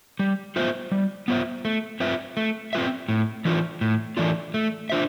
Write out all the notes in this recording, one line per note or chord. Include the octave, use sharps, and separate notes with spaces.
G3
B3 F4 C5 E5
G3
B3 F4 C5 E5
A3
C4 F4 B4 E5
A3
C4 F4 B4 E5
A2
E3 A3 D4 F4
A2
E3 A3 D4 F4
A3
D4 F4 C5 E5